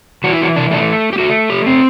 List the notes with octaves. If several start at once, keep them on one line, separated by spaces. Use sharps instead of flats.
E3 F#4
E4
F#4
D4
A3 D4
G4
A3 F#4
G4
C4